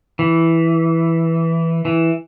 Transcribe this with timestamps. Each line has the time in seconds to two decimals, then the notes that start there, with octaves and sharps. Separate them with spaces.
0.19 E3
1.85 E3